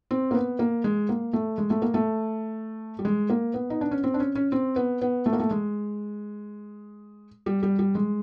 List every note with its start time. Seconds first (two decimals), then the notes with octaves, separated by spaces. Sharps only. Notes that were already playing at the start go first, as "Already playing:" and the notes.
0.11 C4
0.31 A#3
0.35 B3
0.59 A#3
0.84 G#3
1.09 A#3
1.33 A3
1.58 G#3
1.70 A3
1.82 A#3
1.94 A3
2.99 G3
3.05 G#3
3.30 A#3
3.54 B3
3.70 D#4
3.81 D4
3.91 C#4
4.04 C4
4.14 D4
4.20 C#4
4.35 C#4
4.52 C4
4.76 B3
5.02 B3
5.26 A3
5.33 A#3
5.39 A3
5.51 G#3
7.46 G3
7.63 G3
7.79 G3
7.95 G#3